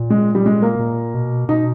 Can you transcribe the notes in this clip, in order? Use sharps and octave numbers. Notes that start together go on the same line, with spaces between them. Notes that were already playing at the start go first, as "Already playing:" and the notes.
Already playing: A#2
G#3
G3
G#3
A#3
A#2
B2
B2 D#4